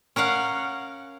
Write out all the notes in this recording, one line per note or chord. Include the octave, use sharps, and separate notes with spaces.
C#4 A#4 F5 F#5